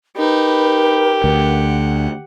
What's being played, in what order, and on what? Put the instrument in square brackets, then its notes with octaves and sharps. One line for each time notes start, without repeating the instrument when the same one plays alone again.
[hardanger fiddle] D#4 B4 [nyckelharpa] G4 [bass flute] A#4
[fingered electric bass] D2 [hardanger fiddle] F#5